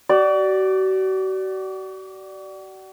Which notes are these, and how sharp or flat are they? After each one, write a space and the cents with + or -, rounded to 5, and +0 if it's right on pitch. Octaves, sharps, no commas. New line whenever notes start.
F#4 +40 D5 +0